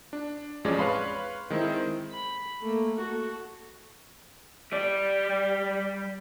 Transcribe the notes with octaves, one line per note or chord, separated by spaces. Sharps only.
D4
A1 F2 G#3 C#4 G#4 D5
B4 C#5 F5 B5 C6
D#3 G#3 C4 D#4 E4 C5
B5
A3 A#3
F#4 A4
G3 D5